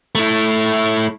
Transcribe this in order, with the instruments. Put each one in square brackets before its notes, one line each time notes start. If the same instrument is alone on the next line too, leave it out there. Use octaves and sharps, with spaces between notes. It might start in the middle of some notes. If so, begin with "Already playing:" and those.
[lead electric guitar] A3 E4